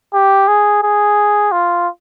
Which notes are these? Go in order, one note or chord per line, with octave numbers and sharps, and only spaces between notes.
G4
G#4
G#4
F4